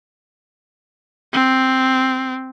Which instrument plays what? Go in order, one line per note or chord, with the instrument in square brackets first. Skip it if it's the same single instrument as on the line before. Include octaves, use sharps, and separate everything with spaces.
[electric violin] C4